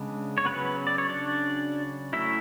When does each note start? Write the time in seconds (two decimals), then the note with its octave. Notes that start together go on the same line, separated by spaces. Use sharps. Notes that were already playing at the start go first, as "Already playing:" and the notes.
Already playing: C#3 G#3 B3 D4
0.38 C#5
0.45 C#3 F#3 B3 C#4 B4
0.87 D5
0.98 C#5
1.09 D4 D5
2.13 F#3 A3 C#4 E4 E5